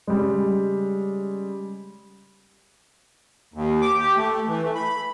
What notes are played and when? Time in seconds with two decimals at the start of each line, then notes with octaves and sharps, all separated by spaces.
0.07 C#3 G3 G#3
3.54 D#2
3.82 D6
3.98 G4
4.16 A3
4.48 E3
4.63 A3
4.75 B5